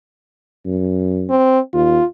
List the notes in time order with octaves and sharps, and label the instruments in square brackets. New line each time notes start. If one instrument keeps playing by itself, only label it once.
[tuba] F#2
[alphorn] C4
[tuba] D#2 [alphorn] F4